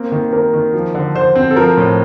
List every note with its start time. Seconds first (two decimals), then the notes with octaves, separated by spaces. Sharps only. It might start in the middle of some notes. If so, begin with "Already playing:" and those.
Already playing: A#3 C4
0.12 D#3
0.33 A#3 A#4
0.54 D#3
0.74 F3
0.95 D3
1.15 D3 C5
1.36 C4
1.51 A4
1.56 F3 A#4
1.77 A2